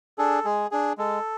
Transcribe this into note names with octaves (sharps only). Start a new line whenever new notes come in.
D4 G#4 A4
G#3 G#4
D4 G#4
G#3 A4